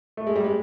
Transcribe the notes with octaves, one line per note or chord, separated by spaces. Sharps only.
A3
G#3
G3
G#3